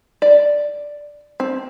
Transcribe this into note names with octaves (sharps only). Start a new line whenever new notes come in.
D5
C4